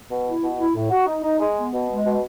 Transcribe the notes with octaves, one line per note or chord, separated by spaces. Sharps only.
B2
E4
B2
E4
A2
F#4
D#4
D#4
G#3
B3
B2
G#3
B2